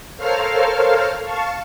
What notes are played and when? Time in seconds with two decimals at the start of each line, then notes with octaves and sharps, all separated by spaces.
0.17 A4 A#4 C5 C#5 F5 F6
1.22 F5 A5 C#6